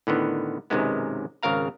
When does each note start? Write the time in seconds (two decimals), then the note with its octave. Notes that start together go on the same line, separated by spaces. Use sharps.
0.07 A2 D3 D#3 B3
0.70 B1 F#2 C3 D#3 G#3 B3
1.43 G#1 C#3 A#4 F5 A#5